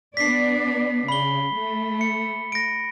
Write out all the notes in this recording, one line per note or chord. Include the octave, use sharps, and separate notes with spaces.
B3 D4 D5 B6 C7
C#3 B5 G7
A3
C#7
A#6 D7